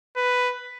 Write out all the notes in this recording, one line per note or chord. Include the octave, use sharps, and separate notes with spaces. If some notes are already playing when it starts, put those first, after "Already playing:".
B4